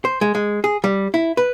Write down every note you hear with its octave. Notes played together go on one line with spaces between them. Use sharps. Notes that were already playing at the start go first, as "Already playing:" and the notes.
C5
G#3
G#3
G#4
G3
E4
B4